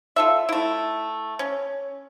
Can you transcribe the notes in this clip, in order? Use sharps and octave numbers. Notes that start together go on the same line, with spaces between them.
F4 A4 E5
A3 E4
C#4